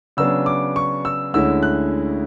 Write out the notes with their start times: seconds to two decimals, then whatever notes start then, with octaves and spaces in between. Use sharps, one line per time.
0.17 C#3 F#3 B3 D4 E6
0.46 D6
0.76 C#6
1.05 E6
1.33 D2 D3 G#3 C#4 E4 E6
1.63 F#6